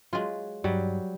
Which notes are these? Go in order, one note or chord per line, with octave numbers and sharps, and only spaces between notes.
F#3 G#3 F4
G2 F#3 G3